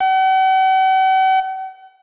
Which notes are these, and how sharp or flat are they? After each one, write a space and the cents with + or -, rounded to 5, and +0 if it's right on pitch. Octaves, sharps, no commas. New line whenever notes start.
F#5 +45